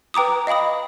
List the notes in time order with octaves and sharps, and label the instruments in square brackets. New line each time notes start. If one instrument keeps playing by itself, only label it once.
[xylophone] B4 G5 A#5 D6 D#6
D#5 F5 G5 B5 D#6